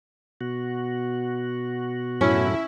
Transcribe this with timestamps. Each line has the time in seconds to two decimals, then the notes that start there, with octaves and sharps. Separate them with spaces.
0.41 B2 F#4
2.21 F#2 A2 C#4 E4